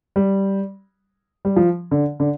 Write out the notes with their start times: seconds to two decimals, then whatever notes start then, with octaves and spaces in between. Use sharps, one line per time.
0.16 G3
1.45 G3
1.56 F3
1.91 D3
2.20 D3